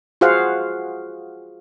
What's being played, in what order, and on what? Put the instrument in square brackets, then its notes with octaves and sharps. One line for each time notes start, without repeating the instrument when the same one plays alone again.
[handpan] F4 F#4 G#4 C5 F5 F#5